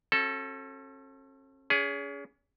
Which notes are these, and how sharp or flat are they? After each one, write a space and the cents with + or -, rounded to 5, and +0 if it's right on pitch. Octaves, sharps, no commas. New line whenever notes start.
C#4 -45 F#4 +0 A4 -5
C#4 +35 G#4 +0